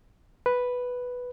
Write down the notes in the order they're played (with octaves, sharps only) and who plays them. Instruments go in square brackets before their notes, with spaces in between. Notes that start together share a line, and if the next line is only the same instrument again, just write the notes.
[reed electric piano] B4